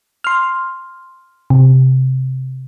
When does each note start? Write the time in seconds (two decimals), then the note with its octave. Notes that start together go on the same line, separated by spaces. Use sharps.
0.24 C6 F6
1.50 C3